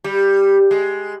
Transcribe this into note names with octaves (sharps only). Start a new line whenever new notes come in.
G3
G#3